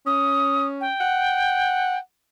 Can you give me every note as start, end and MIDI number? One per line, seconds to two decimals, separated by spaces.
0.06 0.87 61
0.06 0.67 87
0.81 1.99 79
1.01 1.98 78